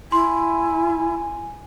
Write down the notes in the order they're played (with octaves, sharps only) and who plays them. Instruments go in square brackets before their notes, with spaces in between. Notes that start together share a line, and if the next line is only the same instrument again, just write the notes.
[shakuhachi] E4 [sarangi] G#5 [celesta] C6